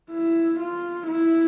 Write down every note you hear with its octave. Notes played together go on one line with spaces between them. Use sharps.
E4
F4
E4